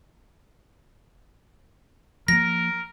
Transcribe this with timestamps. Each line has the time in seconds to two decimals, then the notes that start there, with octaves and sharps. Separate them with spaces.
2.28 F3 A#3 A#4 A#6